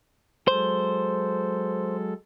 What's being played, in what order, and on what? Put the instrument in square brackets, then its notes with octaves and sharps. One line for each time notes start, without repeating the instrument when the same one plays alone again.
[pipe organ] F#3 G#3 A4 [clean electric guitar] C5